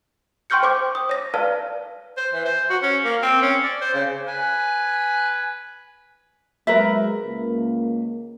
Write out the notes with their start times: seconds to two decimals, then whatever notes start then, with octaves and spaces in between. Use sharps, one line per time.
0.50 G5 C6 C#6 F6 G6 C#7
0.63 C5 G5 D6
0.95 D#6
1.09 C#5 A#6
1.34 B4 D5 F5 A5 F6
2.17 C5
2.33 E3
2.45 C5
2.70 F#4
2.82 C#4
3.05 A#3
3.22 C4
3.42 C#4
3.63 D5
3.81 C5
3.94 C#3
4.27 B4 G#5
6.67 F#3 G#3 A#4 B4 E5
7.23 C#2 A#3